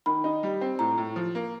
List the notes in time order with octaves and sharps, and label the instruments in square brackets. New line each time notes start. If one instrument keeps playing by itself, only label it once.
[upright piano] D#3 [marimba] B5
[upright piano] D#4
G3
C4
[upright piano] A2 [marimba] A#5
[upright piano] A2
F3
A#3